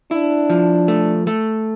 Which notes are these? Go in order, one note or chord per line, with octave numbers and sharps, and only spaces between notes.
D4 E4
F3
A3
A3